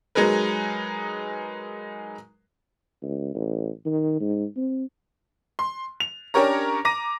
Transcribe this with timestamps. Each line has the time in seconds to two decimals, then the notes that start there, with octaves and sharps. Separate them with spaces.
0.15 F#3 G#3 D#4 G#4 A#4 B4
3.02 C#2
3.34 A1
3.85 D#3
4.20 G#2
4.56 C4
5.59 C6
6.00 F7
6.34 C#4 D4 G4 A#4 C#5 A#5
6.85 A#5 D6 A#6 D#7